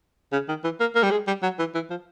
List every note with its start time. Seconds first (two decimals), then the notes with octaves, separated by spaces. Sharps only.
0.33 C#3
0.49 D#3
0.64 E3
0.80 A#3
0.96 A#3
1.03 G3
1.11 G#3
1.27 G3
1.43 F#3
1.59 E3
1.75 E3
1.90 F3